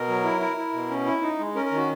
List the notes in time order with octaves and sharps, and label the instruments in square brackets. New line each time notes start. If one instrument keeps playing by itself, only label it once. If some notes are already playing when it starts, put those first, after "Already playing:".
Already playing: [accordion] B2 A#4
F#3
E4
E4
E4
B2
C#4
E4
D#4
G#3
C#4 A#4
A#4
D#3
F#4